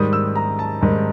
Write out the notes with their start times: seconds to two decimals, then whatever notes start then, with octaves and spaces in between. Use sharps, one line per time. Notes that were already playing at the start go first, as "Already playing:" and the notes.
Already playing: G#2 D#3 G3 D#6
0.13 E6
0.36 A#5
0.59 A5
0.81 G#2 D#3 G3